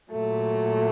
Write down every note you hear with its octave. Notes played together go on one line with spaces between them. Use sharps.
A#2 F#3 A3